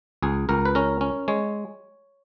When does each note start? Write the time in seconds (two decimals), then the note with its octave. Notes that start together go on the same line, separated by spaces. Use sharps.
0.22 C#2 G#4
0.49 C#2 A#4
0.65 B4
0.75 C#4 A#4
1.01 C#4
1.28 G#3 C#5